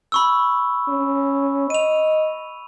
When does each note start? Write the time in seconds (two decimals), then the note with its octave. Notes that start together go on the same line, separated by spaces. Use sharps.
0.12 B5 C#6 E6
0.89 C#4
1.70 D#5 D#7 F7